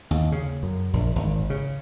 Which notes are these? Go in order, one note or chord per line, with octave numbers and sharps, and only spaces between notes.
D#2
C#3
F#2
A#1
G#1
C#3